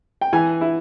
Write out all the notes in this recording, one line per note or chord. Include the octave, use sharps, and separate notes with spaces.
G5
E3 G#5
E4